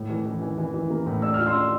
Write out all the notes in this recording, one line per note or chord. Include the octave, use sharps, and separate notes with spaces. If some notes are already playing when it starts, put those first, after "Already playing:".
Already playing: A2
E3
E3
E3
E3
E3
A#3
A2
D4 E6
F4 F6
C6 E6
D4